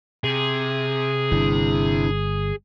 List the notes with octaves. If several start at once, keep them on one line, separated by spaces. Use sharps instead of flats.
C3 G#4
G1 D4 E4